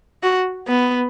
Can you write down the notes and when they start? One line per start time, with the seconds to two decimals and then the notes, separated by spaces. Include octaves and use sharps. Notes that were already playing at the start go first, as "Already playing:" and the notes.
0.23 F#4
0.68 B3